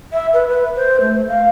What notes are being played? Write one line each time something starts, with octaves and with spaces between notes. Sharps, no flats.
E5
B4
B4
C5
A3
F5